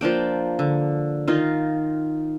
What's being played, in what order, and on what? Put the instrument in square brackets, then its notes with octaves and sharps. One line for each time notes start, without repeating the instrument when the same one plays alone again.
[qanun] F3 A#3 D4 G5
D3
D#3 D#4 F4